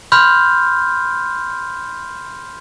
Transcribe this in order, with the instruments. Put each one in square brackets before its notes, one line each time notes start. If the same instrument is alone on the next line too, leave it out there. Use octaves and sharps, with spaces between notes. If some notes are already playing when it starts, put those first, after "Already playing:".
[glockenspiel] B5 C6 F6 G6